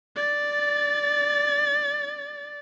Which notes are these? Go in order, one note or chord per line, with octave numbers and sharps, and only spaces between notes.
D5 A6